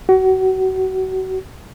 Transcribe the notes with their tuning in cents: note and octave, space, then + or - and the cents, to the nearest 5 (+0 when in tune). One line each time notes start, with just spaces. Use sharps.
F#4 +30